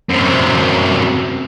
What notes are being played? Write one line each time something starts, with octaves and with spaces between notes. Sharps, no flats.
F#2 C3